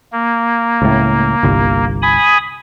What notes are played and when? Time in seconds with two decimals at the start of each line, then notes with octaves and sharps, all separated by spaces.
0.12 A#3
0.82 C#2 A2
1.43 G1 C2
2.02 G#5 B5 D#6